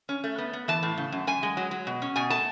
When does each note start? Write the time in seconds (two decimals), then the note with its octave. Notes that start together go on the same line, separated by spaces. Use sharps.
0.09 C#4
0.24 A3
0.38 B3
0.53 B3
0.68 E3 A5
0.83 A2
0.98 C#3
1.12 F#2
1.27 F#2 G#5
1.43 G#3
1.57 F#3
1.71 F#3
1.87 B2
2.02 C#4
2.16 B2 G#5
2.30 A3 A5